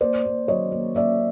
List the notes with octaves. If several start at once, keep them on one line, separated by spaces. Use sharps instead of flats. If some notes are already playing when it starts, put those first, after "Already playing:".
A#3 C5 D5
A#3
F#3 C#5 D#5
A#3
A#3 D5 E5